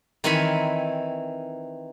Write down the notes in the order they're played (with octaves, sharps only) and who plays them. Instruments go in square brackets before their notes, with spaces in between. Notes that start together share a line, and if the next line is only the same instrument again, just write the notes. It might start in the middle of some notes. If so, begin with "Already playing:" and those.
[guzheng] D#3 E3 C4 C#5 G#5 B5